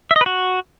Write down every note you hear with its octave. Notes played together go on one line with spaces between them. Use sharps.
E5
D#5
B4
F#4